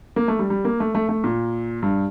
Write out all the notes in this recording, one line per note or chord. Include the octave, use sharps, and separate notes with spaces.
A#3
A3
G3
G3
A#3
A3
A3
A3
A#2
G2